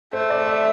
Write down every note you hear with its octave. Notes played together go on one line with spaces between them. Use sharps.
A3 C5
D5
E5